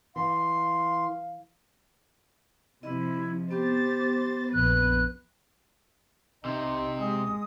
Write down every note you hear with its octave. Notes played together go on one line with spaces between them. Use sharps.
E3 F5 C6
C3 F3 E4 D#5
B3 G4 C5 A6
A#1 F2 B4 F#6
C3 D#4
G#3 D#6